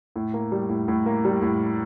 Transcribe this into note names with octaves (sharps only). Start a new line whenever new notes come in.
A2
A#3
G3
A2
A2
A#3
G3
A2